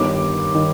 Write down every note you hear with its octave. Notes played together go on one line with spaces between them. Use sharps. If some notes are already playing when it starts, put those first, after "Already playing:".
Already playing: G1 G2 D#3 D6
D#3